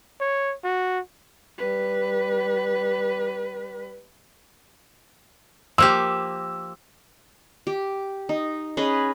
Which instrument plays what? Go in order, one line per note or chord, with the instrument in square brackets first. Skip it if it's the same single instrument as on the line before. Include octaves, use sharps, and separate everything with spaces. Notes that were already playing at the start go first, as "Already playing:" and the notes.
[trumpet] C#5
F#4
[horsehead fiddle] G3 B4
[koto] F3 A#3 G4 [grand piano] E6
[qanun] G4
D#4
C#4 G#4 B4 D#5